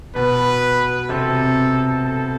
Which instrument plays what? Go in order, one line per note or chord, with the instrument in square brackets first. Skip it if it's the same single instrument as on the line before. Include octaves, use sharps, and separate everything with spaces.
[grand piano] B2 B3 [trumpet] B4
[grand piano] C3 C4 [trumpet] A4
[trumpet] A4